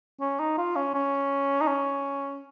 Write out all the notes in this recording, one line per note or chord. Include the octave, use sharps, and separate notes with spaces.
C#4
D#4
F4
C#4
C#4
D#4
C#4